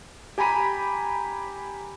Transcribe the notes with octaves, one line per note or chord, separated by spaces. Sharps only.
G4 G#5 A#5 B5 D#7